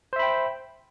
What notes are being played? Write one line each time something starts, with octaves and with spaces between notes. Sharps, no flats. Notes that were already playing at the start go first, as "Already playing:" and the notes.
C5 E5 G5 B5